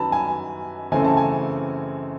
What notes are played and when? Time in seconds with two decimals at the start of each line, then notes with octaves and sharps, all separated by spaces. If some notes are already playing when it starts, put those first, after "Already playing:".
Already playing: F#2 D#3 F#3 B3 A5 B5
0.12 G#5
0.92 F#2 C#3 E3 A3 C4 G#5
1.05 A5
1.17 G#5